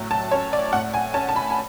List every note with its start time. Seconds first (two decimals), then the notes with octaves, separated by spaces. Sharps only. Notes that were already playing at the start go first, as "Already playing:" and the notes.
Already playing: A2 F#3
0.11 A5
0.31 C#4 C#5
0.53 D5
0.73 A2 F#5
0.94 G#5
1.14 C#4 A5
1.29 A5
1.36 B5
1.50 G#5